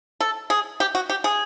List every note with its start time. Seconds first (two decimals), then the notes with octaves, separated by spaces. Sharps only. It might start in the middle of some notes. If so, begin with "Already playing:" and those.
0.20 A4
0.50 G#4
0.80 G4
0.95 F#4
1.10 G4
1.24 G#4